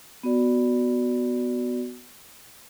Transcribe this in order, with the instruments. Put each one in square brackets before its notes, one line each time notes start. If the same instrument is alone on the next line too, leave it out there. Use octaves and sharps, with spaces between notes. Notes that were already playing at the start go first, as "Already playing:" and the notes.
[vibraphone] B3 F#4 D5